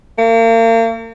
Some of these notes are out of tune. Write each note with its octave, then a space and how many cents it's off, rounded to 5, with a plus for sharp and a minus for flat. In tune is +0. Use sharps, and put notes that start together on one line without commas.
A#3 -40